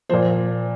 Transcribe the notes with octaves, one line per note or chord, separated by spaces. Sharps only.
A#2 F3 C5